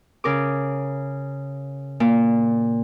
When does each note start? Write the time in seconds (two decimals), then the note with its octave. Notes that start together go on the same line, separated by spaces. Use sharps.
0.24 C#3 A#4 D6
2.00 A#2